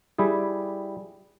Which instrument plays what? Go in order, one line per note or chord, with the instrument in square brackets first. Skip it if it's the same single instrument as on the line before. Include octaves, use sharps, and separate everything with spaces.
[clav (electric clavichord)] G3 E4 G4 G#4